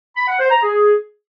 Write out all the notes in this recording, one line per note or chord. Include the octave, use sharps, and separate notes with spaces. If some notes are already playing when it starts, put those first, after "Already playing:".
B5
F#5
C5
A#5
G#4